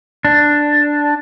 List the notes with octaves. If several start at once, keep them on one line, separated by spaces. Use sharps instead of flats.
D4